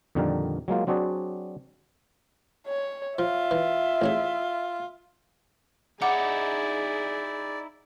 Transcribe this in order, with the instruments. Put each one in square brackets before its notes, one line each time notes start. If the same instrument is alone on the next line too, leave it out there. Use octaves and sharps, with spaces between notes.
[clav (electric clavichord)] F2 A#2 D3 D#3 G3 A#4
F#3 G#3 A#3 F4
F#3 C4 D4 F#4 G#4 D5
[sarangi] C#5
[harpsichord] F3 [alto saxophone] F4 [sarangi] E5
[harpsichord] E3
A1 C#4 G#4
[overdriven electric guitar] D#4 E4 [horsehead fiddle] G#4 [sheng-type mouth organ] D5 [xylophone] F#5 D6 C#7